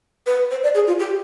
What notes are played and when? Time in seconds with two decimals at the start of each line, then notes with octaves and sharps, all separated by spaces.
0.27 B4
0.51 C5
0.63 D5
0.75 G#4
0.87 F4
0.99 G4